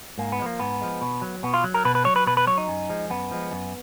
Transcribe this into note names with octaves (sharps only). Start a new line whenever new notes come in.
G#2 A#3
B3
G#3
F3 A#3
G#2 B3
F3 G#3
B2
F#3
B2 B3
F4
F#3
A#4
B2 B4
B4
F#3 C#5
B4
B2 B4
B4
F#3 C#5
D#4
F#2
F3 G#3
F#2 B3
F3 G#3
F#2